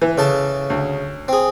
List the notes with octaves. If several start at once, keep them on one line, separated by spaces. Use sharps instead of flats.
E3
C#3 A4 A5
D2
C4 G#4